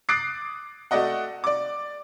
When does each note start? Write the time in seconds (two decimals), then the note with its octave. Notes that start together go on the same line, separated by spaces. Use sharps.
0.09 D6 D#6 F#6 A6 C7 D7
0.91 A3 F#4 D5 D#5 F#5
1.44 D5 D6